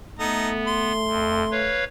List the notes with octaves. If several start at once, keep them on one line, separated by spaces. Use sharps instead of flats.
A3 B3 D#4 A4 A#5
C6
F2
B4 C#5 F5